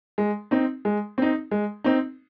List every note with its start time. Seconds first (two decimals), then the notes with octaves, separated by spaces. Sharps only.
0.18 G#3
0.51 C4 D#4
0.85 G#3
1.18 C4 D#4
1.51 G#3
1.84 C4 D#4